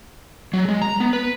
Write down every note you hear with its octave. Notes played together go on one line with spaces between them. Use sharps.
F#3
G#3
A#5
B3
B4